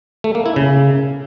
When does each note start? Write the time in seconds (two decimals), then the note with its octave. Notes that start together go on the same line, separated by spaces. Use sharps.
0.24 A3
0.35 A#3
0.46 E4
0.56 C#3